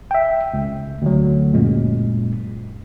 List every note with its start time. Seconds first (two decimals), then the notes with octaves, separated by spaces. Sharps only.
0.11 E5 G5
0.54 C#2
1.02 D2 D3 F#3
1.54 F#2 A#2 G#3